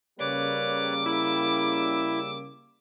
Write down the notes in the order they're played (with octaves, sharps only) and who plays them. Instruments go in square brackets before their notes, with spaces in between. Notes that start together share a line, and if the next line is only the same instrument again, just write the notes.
[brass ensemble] C#3 G3 A#3 [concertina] B4 C#5 D5 [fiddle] D6
[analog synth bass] E4 [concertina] E6